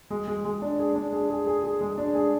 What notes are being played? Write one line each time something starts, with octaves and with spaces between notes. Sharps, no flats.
G#3
G#3
G#3
D4
G#4
D4
G#4
G#4
G#4
G#4
G#3
D4
G#4